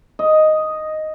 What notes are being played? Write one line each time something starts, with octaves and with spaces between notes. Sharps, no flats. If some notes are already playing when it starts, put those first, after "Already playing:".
D#5